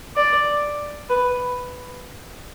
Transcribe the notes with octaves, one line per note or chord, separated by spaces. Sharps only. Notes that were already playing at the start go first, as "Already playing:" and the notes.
D5
B4